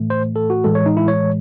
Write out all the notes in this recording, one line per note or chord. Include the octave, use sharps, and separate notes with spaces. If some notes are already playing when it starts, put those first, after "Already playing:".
Already playing: A2 E3 A3
C5
A4
F#4
A2 E3 G#3 A4
C#5
D#4
E4
C#5